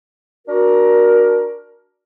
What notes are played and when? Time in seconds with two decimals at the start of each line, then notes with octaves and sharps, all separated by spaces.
0.48 D4 F#4 A#4